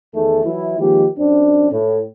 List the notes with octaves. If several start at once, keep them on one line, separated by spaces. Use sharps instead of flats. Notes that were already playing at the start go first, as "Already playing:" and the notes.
E2 D#3 A3 G#4 A4
E3 F#3 E4
D#3 F3 G#3 A#3 G4
F#2 C4 D4
A2